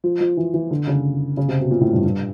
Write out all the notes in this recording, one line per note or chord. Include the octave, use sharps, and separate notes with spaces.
F3
F3
E3
E3
D3
C#3
C#3
C3
B2
A#2
A2
G2
G2